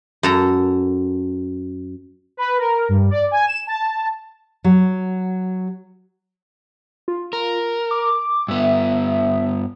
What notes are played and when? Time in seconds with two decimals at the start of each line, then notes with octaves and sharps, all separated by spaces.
0.23 F#2 A4 A#5
2.37 B4
2.58 A#4
2.89 G2
3.10 D5
3.31 G#5
3.47 E7
3.67 A5
4.64 F#3
7.08 F4
7.33 A#4
7.91 D6
8.48 G2 B3 E5